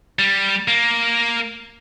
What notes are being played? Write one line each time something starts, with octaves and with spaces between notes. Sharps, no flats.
G3
A#3